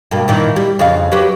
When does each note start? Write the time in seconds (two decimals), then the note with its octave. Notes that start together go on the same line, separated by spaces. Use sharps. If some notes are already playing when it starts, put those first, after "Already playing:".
0.11 G2 B2 A#3
0.28 A#2 D#3 E3
0.56 G3
0.79 F2 C#3 F5
1.12 F#3 G4 B4